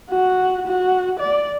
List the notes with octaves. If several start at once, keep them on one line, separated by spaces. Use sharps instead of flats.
F#4
F#4
D5